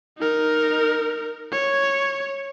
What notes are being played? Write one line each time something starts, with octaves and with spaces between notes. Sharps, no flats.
D#4 A#4
C#5